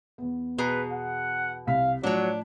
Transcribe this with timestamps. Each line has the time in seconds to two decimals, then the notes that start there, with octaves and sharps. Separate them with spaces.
0.18 E2 B3
0.58 B2 G#4 B4 A#5
0.92 F#5
1.67 C2 F5 B6
2.03 A2 F3 F#3 D4 C#5